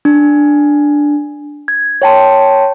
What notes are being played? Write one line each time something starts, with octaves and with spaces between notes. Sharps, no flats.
D4
G#6
C#5 G5 A5 C6